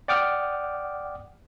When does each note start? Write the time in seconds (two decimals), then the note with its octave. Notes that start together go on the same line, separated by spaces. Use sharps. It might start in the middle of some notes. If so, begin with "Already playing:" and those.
0.08 D5 F#5 G5 D6 D#6 F6